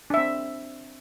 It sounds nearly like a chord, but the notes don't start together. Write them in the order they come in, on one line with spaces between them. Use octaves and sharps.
D4 E5 C4